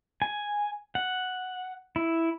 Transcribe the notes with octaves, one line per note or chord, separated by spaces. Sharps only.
G#5
F#5
E4